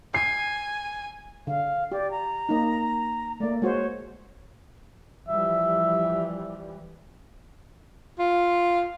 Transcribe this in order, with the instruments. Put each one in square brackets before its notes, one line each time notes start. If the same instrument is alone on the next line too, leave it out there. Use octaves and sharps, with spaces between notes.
[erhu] G#5 [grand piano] C7
[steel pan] D3 [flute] F5
[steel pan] G4 [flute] D5
[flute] A#5
[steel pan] A#3 D#4
[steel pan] A3 A#3 [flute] D5
[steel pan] G#3 F#4 C5 [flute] C#5
[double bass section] E3 F3 G3 [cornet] E5
[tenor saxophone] F4